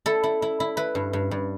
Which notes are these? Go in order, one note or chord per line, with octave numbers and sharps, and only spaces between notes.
E4 A4
E4
E4
E4
E4 B4
G2
G2
G2